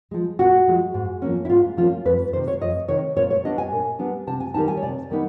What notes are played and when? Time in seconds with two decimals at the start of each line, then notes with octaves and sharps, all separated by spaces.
0.11 F3 G#3
0.39 A#2 F#4
0.68 F3 G#3
0.94 G#2
1.22 F3 A#3 C#4
1.45 E4
1.50 G#2 F4
1.77 F3 A#3 C#4 F4
2.05 F2 B4
2.33 C3 D#3 C5
2.48 C#5
2.61 F2 D#5
2.88 C3 D#3 C#5
3.17 A#2 C#5
3.30 C#5
3.44 G3 B3 D4 D#5
3.58 G#5
3.72 A#2
3.99 G3 B3 D4
4.27 C3 A5
4.40 G#5
4.54 D#3 G3 B3 D#4 A5
4.68 G#5
4.77 C#5
4.83 C3 D5
5.10 D#3 G3 B3 D#4